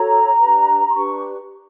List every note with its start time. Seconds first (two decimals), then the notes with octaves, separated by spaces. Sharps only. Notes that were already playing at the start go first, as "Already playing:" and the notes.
Already playing: F#4 A4 C#5 A#5
0.40 D4 G4 B4
0.89 C6
0.93 D4 G4 B4 C#6